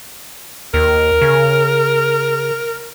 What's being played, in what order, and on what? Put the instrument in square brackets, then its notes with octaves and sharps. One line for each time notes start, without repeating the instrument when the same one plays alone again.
[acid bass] D#2 [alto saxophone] A#4
[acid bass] C#3